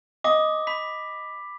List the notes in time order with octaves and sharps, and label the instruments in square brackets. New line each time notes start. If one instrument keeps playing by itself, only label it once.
[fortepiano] D#5 [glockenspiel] D6
[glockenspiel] B5 B6